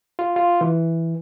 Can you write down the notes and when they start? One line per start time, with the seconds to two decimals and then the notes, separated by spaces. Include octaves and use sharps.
0.19 F4
0.36 F4
0.61 E3